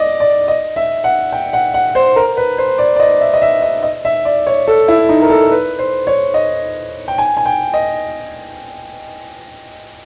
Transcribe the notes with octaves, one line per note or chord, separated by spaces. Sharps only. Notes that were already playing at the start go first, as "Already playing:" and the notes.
Already playing: D5 D#5
D5
D#5
E5
F#5
G5
F#5
F#5
C5
A#4
B4
C5
D5
D5
D#5
E5
D#5
E5
D#5
D#5
E5
D5
C#5
A4
E4
D#4
A#4
A4
B4
C5
C#5
D#5
G5
G#5
G#5
G5
D#5